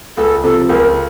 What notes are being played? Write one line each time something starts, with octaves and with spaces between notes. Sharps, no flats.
C#2 A4
C3 F3 A4
C#2 A#4